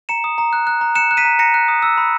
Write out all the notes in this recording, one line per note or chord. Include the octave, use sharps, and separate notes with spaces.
A#5 C#7 E7
D#6
A#5
F#6
F#6
A#5
F#6 C#7 E7
F#6
B6 D#7
A#5
A#5 A#6 C#7
F#6
D#6
E6
B5